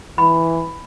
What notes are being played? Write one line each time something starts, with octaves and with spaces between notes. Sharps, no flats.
E3 B5